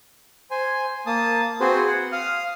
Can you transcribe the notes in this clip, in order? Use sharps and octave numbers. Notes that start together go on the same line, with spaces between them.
C5 G#5
A#3 A5 D#6
C4 F#4 G#4 B4 C5
F#5
F5 D#6 F6